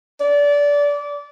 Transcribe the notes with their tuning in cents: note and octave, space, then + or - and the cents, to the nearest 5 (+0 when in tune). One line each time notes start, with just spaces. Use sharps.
D5 -25